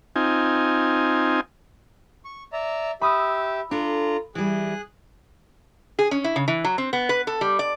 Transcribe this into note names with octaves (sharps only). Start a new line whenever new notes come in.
C4 D#4 F4 G#5
C#6
D5 E5 A#5
G4 E5 B5 D#6 E6
D4 F4 A4 A#5
E3 G3 G#4 F#6
G#4
C#4
E4
C#3
E3
F#3
C4
B3
B4
A4
G3
D5